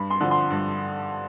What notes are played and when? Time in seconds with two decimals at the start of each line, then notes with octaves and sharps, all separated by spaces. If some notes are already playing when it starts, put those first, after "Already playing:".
Already playing: G2 B5
0.10 C6
0.20 D3 F3
0.31 C6
0.51 G2